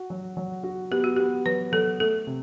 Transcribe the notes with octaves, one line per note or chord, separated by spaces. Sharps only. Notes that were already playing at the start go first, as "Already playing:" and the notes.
Already playing: F#4
F#3
F#3
F#4
B3 G4
F#4
B3 G4
F#3 B4
F#3 A4
A3 A4
C3